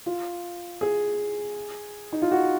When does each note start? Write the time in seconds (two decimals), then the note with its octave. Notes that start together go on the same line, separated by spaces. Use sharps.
0.06 F4
0.81 G#4
2.13 D#4
2.22 F4
2.31 F#4